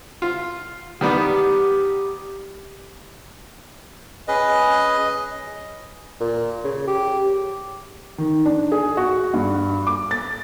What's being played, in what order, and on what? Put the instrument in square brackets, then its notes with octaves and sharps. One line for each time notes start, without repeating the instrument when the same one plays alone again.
[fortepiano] F4
[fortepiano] D#3 G3 B3 [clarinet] G4
[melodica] C#4 G#4 B4 [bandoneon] D#5
[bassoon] A#2
C#3
G4
[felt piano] D#3
D4
G#4
F#4
G2
D6
A6